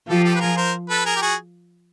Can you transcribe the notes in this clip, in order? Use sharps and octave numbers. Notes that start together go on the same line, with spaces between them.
F3 F4 G4 A4
G4 A4
B4
G#4 A#4
A#4 C5
A4 B4
G#4 A#4
G4
F#4 G#4